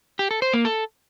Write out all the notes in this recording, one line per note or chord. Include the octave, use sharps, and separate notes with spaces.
G4
A4
C5
A#3
A4